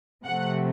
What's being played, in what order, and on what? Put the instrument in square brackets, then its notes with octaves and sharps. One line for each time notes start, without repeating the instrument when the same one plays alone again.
[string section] C3 F3 A3 F#5